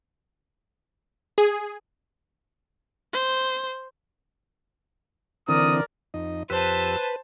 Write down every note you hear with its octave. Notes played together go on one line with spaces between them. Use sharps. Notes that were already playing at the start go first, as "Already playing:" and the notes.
G#4
C5
D3 E3 C4 A#4 D5 D#6
F2 D#4 D#5
F2 G4 B4 C5 A5 E6